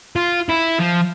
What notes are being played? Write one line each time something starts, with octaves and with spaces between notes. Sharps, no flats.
F4
E4
F3